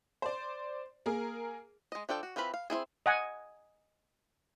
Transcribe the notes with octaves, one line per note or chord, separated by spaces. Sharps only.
C5 D5
A#3 G#4 A#4
G#3 D#5
F3 D4 A4 G5
F#4
E3 C4 F4 B4 B5
F5
C4 D#4 E4 G#4
D#5 F#5 G#5